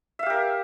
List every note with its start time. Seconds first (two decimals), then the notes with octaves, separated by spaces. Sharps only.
0.19 E5
0.23 F5
0.26 G4
0.30 A#4